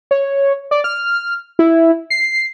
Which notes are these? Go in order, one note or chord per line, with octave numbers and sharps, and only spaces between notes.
C#5
D5
F6
E4
C7